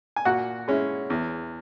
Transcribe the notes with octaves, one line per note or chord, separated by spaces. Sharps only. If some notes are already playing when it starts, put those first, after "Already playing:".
G#5
A#2 F#4 F#5
G#3 C#4 E4
E2